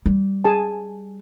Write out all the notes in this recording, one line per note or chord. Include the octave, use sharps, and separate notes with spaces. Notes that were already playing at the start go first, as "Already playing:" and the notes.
G3
G#4 G#5 A5